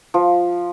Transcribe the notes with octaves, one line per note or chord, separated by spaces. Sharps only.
F3